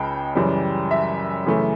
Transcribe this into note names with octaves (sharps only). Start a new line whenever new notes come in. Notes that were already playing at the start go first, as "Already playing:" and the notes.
Already playing: C#2 C#3 G5 A5
F#2 C#3 E3 G3
E5
F#2 C#3 E3 A3